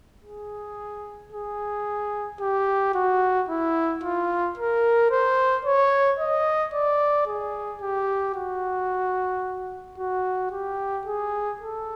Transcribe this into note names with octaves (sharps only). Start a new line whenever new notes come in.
G#4
G#4
G4
F#4
E4
F4
A#4
C5
C#5
D#5
D5
G#4
G4
F#4
F#4
G4
G#4
A4